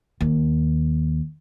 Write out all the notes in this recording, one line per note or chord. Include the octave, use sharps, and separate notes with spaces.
D#2